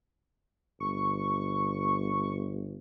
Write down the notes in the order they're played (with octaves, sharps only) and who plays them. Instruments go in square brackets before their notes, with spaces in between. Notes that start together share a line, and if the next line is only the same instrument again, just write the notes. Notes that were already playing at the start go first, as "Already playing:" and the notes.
[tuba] G1 [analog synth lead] C#6